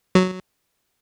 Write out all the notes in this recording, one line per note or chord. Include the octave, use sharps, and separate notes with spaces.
F#3